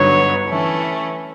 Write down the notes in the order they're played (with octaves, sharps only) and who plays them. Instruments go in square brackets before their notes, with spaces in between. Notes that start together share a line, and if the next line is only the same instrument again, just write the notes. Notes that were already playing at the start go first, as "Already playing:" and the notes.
Already playing: [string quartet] G2 D3 F#3 B3 D#4 [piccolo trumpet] C#5
[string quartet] E3 A3 C#4